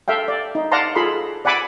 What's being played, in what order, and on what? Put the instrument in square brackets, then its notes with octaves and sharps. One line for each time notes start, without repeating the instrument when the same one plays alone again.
[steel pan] A4 E5 F5 G5
D5
D#4
D5 F5 F#5 A5 A#5 C6
F4 G#4 A4 B5 C6
D5 F#5 G#5 B5 D6 E6